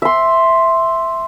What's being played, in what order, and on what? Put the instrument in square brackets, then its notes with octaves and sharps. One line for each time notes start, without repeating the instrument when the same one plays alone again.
[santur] E5 C6